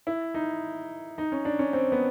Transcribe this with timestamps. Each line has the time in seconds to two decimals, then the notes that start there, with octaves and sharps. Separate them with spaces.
0.07 E4
0.34 D#4
1.18 D#4
1.32 C#4
1.45 D4
1.59 C#4
1.73 C4
1.92 B3